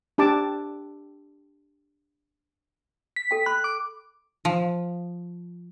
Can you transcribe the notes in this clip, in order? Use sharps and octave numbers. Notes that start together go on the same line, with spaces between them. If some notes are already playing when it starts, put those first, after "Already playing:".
D4 G4 A5 D6
B6
A4 G5
B5 F#6
D6
F3